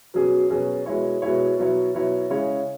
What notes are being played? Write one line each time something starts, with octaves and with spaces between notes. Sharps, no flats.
B2 F#3 C#4 G#4
B2 F#3 C#4 G#4
B2 G#3 E4 C#5
B2 G#3 E4 C#5
B2 F#3 E4 C#5
B2 F#3 E4 C#5
C#3 G#3 E4 C#5